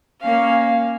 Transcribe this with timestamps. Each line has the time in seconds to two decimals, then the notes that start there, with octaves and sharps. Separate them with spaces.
0.21 A#3 C#4 F5